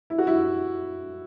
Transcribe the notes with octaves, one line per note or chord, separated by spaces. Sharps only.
E4
F#4
E4